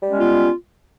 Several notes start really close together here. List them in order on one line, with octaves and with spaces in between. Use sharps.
G3 G#3 C#4 B3 F4